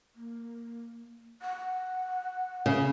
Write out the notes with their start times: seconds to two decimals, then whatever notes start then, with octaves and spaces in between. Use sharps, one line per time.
0.15 A#3
1.42 F#5
2.66 C#3 E5